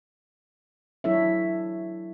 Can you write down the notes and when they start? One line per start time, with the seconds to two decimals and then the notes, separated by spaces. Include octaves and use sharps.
1.04 F#3 D4 E4 A4 C#5 E5